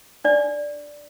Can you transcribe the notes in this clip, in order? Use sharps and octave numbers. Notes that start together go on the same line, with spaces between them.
D4 D5